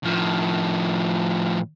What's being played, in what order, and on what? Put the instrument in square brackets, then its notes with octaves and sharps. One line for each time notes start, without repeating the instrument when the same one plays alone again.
[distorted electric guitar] A2 F3